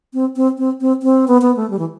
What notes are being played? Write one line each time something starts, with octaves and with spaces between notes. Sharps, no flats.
C4
C4
C4
C4
C4
B3
B3
A3
G3
E3